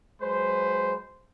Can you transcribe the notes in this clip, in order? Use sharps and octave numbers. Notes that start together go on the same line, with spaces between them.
F#3 G#3 B4 C5